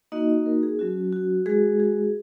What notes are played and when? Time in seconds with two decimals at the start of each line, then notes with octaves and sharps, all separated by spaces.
0.12 A#3 D#4 F#4 D#5
0.29 D#5
0.46 A#4
0.63 G#4
0.79 F#3 C#4 F#4
1.13 F#4
1.46 G#3 F#4 G#4
1.80 G#4